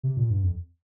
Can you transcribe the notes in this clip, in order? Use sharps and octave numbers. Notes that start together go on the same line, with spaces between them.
C3
A#2
G2
F2